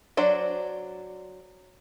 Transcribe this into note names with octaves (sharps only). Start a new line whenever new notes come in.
F#3 D4 C5 D5